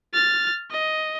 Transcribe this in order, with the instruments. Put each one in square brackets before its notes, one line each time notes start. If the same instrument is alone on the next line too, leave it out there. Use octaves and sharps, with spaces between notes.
[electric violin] F6 A6
D#5